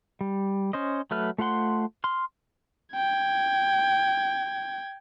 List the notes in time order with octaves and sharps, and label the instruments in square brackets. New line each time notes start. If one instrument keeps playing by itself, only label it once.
[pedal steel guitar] G3
C#4 C5 D#5
F#3 A3 B4 F6
A3 F4 C5 F#5 C6
C6 F6
[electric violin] G5 G#6